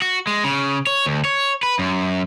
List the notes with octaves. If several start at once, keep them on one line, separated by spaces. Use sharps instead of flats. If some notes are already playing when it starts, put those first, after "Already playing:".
F#4
G#3
C#3
C#5
D2
C#5
B4
F#2